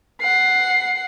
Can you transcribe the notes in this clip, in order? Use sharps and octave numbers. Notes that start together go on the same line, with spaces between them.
F#5 C7